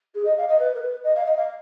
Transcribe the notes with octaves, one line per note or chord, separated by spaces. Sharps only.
G#4
D#5
F5
D#5
B4
A#4
B4
D#5
F5
D#5
F5